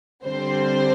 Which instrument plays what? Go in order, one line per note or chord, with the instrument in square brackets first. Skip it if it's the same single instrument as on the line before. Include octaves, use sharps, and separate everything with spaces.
[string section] D3 G3 C4 C5